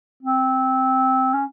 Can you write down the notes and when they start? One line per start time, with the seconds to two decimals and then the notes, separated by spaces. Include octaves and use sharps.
0.23 C4
1.34 C#4